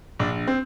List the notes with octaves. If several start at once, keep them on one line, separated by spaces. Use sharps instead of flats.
A#1 D4
C4